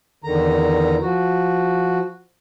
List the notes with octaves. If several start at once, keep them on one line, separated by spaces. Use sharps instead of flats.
E2 D3 D#3 A#5
F3 F#4